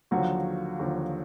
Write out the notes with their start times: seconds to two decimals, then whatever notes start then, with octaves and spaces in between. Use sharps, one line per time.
0.11 D#2 D3 F3 F#3 F#4
0.79 D#2 D3 F3